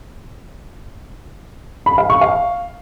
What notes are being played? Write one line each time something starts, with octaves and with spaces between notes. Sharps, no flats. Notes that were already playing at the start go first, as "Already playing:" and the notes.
B5
F5
C#6
F5